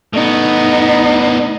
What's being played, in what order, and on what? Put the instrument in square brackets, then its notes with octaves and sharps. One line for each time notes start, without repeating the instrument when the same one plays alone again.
[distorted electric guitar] A2 B3 [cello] D#4